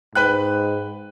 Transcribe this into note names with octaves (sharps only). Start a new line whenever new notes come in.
G#2 B4 G5 F#6